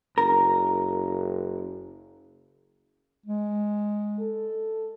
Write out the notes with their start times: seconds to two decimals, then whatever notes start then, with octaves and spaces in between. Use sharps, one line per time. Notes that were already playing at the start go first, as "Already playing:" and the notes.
0.18 F#1 A#4
3.26 G#3
4.20 A4